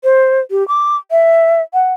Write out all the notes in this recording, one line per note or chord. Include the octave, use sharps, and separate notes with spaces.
C5
G4
D6
E5
F#5